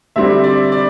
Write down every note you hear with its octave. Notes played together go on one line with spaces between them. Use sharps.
D3 G3 C4 E5
D5
D5